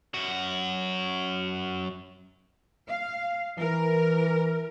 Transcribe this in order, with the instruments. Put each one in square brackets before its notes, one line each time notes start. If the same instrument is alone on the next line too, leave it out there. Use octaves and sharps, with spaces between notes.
[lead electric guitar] F#2 F#4
[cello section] F5
[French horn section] E3 [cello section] A#4